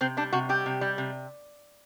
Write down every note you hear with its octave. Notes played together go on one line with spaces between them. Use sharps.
C3 C4
G3 D4
C3 F#4
G3 G4
C3
G3
C3